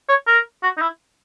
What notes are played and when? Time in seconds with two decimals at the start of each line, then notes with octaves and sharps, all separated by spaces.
0.09 C#5
0.27 A#4
0.63 F#4
0.77 D#4
0.82 E4